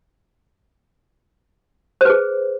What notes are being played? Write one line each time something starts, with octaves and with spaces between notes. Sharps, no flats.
G#4 B4 C5